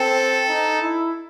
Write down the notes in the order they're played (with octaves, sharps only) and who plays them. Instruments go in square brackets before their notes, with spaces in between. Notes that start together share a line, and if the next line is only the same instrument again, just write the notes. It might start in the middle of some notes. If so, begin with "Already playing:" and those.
Already playing: [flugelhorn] C4 [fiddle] A4
[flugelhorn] D#4
E4